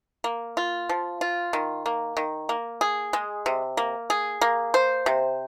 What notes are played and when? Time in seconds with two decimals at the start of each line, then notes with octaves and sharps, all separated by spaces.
0.24 A#3
0.57 F4
0.89 F3
1.21 F4
1.53 D#3
1.86 A#3
2.17 D#3
2.49 A#3
2.81 G#4
3.13 G#3
3.46 C3
3.77 A#3
4.10 G#4
4.41 A#3
4.74 C5
5.06 C3